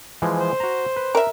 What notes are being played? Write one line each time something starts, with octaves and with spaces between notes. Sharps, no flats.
E3 F3 G#3
C5
F#4 A#5
B4
A#4 E5